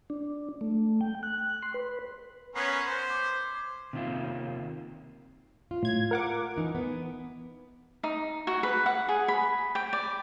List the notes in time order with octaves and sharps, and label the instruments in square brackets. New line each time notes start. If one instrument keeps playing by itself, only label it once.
[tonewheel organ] D4
A3
G5
F#6
C6
B4
[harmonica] B3 C#4 A#4 [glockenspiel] G#6 B6 C7
[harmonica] C5
[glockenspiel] D6
[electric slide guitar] C3 D#3 A#3 C4 F4
[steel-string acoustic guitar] F4
[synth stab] A2 G#6
A#4 F#5 D6
[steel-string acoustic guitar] E3 D#4 G#5
B3
[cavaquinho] D#4
F#4
B4
F#5
G#4
B5
G5
D5